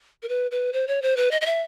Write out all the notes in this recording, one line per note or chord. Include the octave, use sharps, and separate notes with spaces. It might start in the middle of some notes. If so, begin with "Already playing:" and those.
A#4
B4
B4
C5
C#5
C5
B4
D#5
D#5
E5